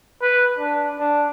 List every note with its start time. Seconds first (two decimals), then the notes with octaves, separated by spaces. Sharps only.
0.22 B4
0.58 D4
0.99 D4